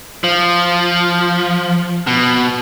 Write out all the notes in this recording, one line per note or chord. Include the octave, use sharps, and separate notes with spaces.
F3
B2